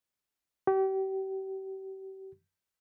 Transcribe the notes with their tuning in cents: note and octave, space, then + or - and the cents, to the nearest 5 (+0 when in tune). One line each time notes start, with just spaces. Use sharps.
G4 -35